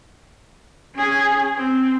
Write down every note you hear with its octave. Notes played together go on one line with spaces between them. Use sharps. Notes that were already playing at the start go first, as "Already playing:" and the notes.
C#4 G#4
C4